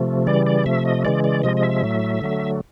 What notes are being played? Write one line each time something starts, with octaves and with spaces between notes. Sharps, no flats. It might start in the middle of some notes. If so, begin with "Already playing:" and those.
Already playing: C3 F3 A3
C#3 E3 G3 D5
D5
C3 F3 A3 E5
D#5
C#3 E3 G#3 D5
D5
C3 F3 G#3 D#5
D#5
E5
A2 F#3 A3
D3 F#3 A3